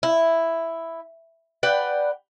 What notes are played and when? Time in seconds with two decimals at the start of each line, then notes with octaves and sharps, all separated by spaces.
0.03 E4
1.63 B4 D5 F#5 G5